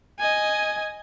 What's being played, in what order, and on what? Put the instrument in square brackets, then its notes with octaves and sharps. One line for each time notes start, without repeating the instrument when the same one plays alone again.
[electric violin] D#5 G#5